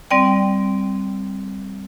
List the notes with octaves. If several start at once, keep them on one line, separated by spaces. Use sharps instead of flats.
G3 C4 D5 G5